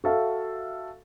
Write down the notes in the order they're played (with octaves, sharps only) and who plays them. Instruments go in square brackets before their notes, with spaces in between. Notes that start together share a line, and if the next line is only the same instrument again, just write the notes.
[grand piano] F#4 A4 E5 F5